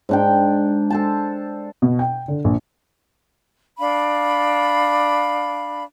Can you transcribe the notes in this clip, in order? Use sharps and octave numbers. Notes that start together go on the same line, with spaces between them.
G#2 D4 G5
A4 C5 A5
B2
G5
D3
A#1
D4 F5 B5